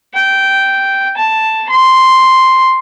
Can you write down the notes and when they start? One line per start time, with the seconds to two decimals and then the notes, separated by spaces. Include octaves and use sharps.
0.15 G5
1.17 A5
1.69 C6